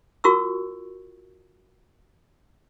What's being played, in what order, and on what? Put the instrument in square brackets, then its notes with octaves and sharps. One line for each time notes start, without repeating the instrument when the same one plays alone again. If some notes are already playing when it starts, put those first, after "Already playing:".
[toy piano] F4 F#4 A#4 C#6 E6